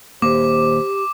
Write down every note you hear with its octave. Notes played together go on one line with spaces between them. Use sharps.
D#1 D#2 A#3 G4 C5 D6